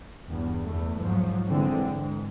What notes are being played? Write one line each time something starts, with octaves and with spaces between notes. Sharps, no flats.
E2 G2
E2 A3
G#2 F3 F#3
D3 E3 G#3 C4
G#2